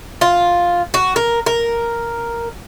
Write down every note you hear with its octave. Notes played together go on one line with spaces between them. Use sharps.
F4
F#4
A#4
A#4